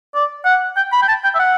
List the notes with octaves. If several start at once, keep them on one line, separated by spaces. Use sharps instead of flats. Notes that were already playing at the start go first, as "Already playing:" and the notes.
D5
F#5
G5
B5
G5
A5
G5
E5
F#5